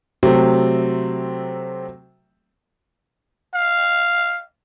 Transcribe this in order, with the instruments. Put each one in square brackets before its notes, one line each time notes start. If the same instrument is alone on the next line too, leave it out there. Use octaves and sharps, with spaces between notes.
[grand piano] C3 F#3 A3 C4
[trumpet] F5